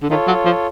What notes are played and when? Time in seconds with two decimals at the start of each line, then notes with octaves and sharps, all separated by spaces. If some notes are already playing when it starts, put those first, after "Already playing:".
0.02 D3
0.10 D#3 F4 A4 C#5
0.28 F#3
0.45 F3